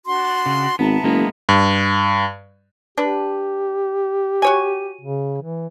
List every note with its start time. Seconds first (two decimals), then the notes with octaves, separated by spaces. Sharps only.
0.05 D4 F#4 C6
0.46 C#3
0.79 G#1 B3 E5 A5 A#5
1.04 F#1 G#3 A#3 B3
1.49 G2
2.98 D4 G4 B4
4.42 F#4 C#5 G#5
5.01 C#3
5.42 E3